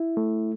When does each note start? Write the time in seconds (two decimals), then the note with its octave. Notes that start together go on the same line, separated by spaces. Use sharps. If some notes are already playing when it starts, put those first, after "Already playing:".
Already playing: E4
0.17 A3